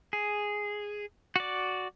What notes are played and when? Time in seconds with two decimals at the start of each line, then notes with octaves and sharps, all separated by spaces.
0.13 G#4
1.36 F#4 D5